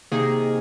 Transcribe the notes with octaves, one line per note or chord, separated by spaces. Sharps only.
C3 D#3 A#3 D#4 G#4